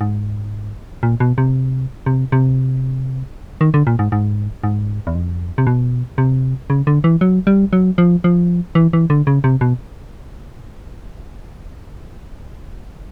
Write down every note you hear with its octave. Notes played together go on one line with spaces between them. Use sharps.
G#2
A#2
B2
C3
C3
C3
D#3
D3
A#2
G#2
G#2
G#2
E2
F2
C3
B2
C3
C#3
D3
E3
F#3
G3
F#3
F3
F3
E3
E3
D3
C#3
C3
B2